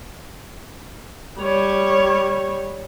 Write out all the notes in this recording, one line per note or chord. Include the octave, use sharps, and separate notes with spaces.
G3 C#5